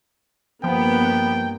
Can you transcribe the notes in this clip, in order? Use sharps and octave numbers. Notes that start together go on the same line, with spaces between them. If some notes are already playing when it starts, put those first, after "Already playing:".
G2 F3 A#3 B3 G5